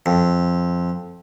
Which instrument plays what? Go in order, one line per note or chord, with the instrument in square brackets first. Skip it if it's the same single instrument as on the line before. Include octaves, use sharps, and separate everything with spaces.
[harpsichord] F2